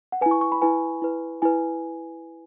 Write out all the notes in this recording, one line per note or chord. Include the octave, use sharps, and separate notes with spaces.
F#5
E4 B4 G#5
C#6
C#6
B5
E4 B4 G#5
E4 B4
E4 B4 G#5